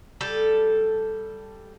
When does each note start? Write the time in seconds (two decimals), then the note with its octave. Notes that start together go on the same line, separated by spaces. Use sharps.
0.21 G3 A4